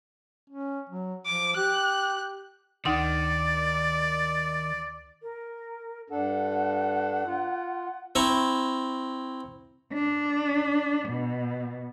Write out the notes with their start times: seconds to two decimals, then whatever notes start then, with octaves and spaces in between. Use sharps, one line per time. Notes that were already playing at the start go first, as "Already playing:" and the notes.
0.50 C#4
0.89 F#3
1.26 F3 D6
1.56 G4 F#6
2.85 D2 D#3 D#4 D5 C6
5.22 A#4
6.10 G2 D4 A4 F#5
7.25 F4
8.15 C4 E4 A#5 C#6
9.93 D4
11.09 B2